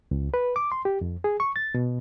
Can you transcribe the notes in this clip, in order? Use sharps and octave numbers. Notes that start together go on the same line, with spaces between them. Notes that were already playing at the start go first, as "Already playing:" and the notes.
C#2
B4
D6
C6
G4
F2
G#4
C#6
A6
B2